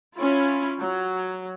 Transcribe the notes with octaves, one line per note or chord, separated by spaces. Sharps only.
C#4 E4 F4
F#3